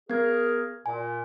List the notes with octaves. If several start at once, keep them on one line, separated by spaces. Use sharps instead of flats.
B3 G#4 A#4 G#6
A#2 G#5